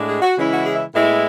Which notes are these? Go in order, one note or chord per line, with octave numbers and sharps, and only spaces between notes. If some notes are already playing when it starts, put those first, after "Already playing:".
Already playing: A2 G#3 D4
G#4
F#4
C#3 E3 G#3 C#4 E4
F#4
G#4
E5
A2 G#3 B3 E4